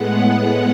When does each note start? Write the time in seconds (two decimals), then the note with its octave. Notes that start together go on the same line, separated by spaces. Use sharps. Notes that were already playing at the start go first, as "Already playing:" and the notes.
Already playing: A2 G#3 B3 F#5
0.25 F#5